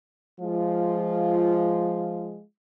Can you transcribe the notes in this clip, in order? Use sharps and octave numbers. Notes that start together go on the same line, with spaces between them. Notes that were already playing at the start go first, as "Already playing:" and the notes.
F3 G#3 F4